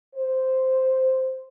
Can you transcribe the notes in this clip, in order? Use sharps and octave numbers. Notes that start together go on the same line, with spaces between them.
C5